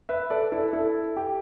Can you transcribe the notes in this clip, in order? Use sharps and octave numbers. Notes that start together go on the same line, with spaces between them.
B4 E5
A4 D5
E4 A4
E4 A4
G4